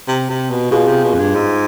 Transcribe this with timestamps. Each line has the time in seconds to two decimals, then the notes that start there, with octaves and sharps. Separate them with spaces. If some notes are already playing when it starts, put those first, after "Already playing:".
0.08 C3
0.30 C3
0.51 B2
0.71 B2 F4 G#4
0.88 C3
1.04 B2
1.14 F2
1.19 G2
1.35 G#2